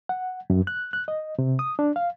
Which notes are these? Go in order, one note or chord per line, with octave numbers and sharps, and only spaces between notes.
F#5
F#2
F#6
F#6
D#5
C3
D#6
D4
F5